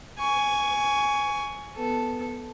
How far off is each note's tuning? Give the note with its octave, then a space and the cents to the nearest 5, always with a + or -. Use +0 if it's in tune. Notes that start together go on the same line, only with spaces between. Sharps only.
G#5 +0 C#6 +20
B3 +0 A4 +0